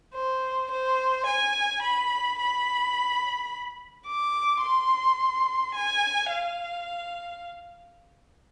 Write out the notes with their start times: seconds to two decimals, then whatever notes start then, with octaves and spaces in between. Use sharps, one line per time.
0.14 C5
0.71 C5
1.26 G#5
1.82 B5
2.39 B5
4.06 D6
4.62 C6
5.75 G#5
6.30 F5